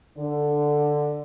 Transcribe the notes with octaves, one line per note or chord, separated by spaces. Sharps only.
D3